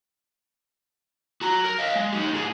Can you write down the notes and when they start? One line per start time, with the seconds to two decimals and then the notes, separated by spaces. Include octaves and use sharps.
1.41 F#4 A#5
1.64 A#4
1.79 D#5 F5
1.95 G#3
2.12 D#4 G4
2.33 A2 G#4